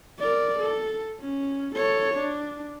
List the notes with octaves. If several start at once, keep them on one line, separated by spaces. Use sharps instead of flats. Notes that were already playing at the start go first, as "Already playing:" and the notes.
A#4 D5
A4
C#4
A4 C#5
D4